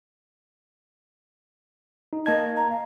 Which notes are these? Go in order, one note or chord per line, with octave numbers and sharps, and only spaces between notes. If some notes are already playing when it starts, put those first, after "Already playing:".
D#4
A#3 D#5 A5 G#6
A#5
F5